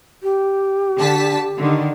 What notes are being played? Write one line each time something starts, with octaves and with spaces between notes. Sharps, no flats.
G4
D3 A5 B6
D3 D#3